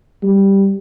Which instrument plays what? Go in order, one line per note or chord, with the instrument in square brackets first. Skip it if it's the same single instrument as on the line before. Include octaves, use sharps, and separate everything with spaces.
[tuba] G3